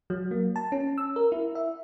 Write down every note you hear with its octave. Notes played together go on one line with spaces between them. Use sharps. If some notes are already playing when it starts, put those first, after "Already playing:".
F#3
A#3
A5
C#4
E6
A#4
E4
E5